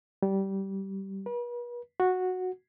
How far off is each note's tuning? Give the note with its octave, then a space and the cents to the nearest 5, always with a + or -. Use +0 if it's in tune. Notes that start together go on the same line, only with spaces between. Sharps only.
G3 -15
B4 -40
F#4 -10